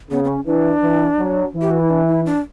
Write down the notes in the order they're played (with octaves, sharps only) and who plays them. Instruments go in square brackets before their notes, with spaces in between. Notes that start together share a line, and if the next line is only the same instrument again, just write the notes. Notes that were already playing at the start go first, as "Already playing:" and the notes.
[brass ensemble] C#3 [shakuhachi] B3
[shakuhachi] B3
C#4
[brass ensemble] E3 [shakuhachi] D4
[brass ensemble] E3
F#3
E3
[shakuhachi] G4
F#4
E4
D4
E4
D4